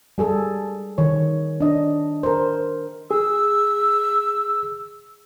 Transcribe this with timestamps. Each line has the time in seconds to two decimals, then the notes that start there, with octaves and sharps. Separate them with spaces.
0.18 G3 G#4 A4
0.98 D#3 C#5
1.60 D4 D#5
2.23 A#4 C5
3.11 G#4 E6